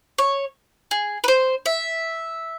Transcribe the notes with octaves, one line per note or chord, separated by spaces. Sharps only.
C#5
G#4
B4
C5
E5